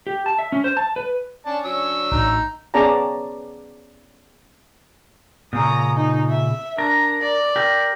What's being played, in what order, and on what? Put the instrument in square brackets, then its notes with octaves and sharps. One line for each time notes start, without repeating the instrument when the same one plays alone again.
[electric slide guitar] G4
A5
E5
C#4
C5
A5
B4
[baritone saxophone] C#4 [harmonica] D5 A5
[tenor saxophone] F#3 [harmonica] D4 E6
[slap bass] A1 [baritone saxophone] D#4
[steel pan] B3 C#4 G#4 D5 A5 A#5
[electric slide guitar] A#2 C#3 [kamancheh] A#5 D#6
[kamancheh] D#4
E5
[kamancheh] D4 A#5 [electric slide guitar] A#4
[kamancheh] D5
[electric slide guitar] G4 A#4